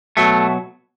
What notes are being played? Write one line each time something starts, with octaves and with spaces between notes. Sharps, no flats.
B2 F#3 A3